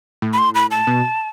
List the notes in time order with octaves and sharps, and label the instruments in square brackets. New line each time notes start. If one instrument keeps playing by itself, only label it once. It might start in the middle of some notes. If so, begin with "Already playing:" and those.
[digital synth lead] A2
[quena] B5
C6
B5
A5
[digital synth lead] B2